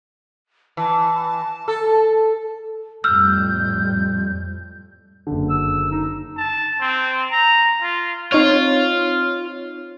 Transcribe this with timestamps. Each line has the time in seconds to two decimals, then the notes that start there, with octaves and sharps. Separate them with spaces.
0.77 E3 A5
1.68 A4
3.04 F2 A2 G3 E6 F6 G6
5.27 F#1 D3
5.50 E6
5.91 D#4
6.37 A5
6.81 C4
7.32 A#5
7.82 F4
8.32 C4 D#4 F4 C#5